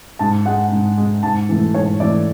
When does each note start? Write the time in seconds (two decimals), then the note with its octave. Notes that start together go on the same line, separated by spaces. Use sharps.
0.19 G#2 A5
0.46 G#3 F#5
0.72 G#2
0.98 G#3
1.23 G#2 A5
1.49 E3 A3
1.74 G#2 C#5
2.00 E3 A3 D5